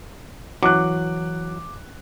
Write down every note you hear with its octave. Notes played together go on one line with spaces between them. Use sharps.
E3 F#3 D6 F#6